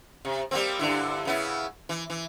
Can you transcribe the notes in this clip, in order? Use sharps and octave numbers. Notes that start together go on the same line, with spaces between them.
C3
G3 A#3 C4
G2 D3 E4
C#3 B3 E4
E3
E3